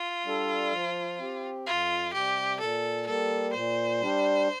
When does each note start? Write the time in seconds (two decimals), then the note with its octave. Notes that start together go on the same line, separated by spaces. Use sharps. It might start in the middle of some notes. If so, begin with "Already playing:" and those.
Already playing: F4
0.25 G3 D4 A4
0.72 F3
1.19 C4 G4
1.66 F2 F4
2.13 C3 G3 G4
2.59 A#2 A4
3.06 G3 A#3 A4
3.54 A#2 C5
4.01 G3 D4